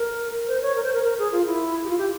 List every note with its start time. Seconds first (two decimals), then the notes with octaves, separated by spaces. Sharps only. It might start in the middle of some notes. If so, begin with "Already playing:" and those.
Already playing: A#4
0.47 C5
0.62 C#5
0.76 A#4
0.84 C5
0.93 A#4
1.04 A#4
1.19 G#4
1.32 F4
1.46 E4
1.85 G4
1.89 F4
1.98 G4